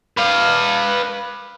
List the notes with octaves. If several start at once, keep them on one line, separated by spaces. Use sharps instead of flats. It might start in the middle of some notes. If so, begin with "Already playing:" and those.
B4 F5